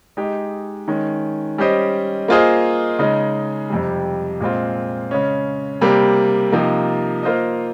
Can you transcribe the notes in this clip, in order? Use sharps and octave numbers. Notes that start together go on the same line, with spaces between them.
G#3 D#4 G4
D#3 G#3 C#4
G3 C#4 G4 C5 D#5
A#3 F4 G#4 C5 D#5
C#3 G#3 D#4
F2 C3 G3
A#2 G#3 C4 F4
C#3 G#3 C#4
C3 G3 A#3
C3 F3 A#3 D#4
A#3 F4 C5 D#5